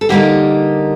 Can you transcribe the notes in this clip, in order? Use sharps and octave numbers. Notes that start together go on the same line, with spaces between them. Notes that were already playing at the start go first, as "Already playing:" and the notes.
A4
D3 G3 A#3 D#4 G4